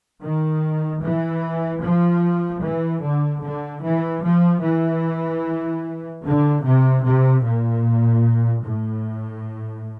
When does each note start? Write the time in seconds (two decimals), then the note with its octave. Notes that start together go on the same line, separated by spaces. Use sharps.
0.22 D#3
1.01 E3
1.81 F3
2.63 E3
3.02 D3
3.42 D3
3.82 E3
4.22 F3
4.62 E3
6.23 D3
6.62 C3
7.03 C3
7.43 A#2
8.63 A2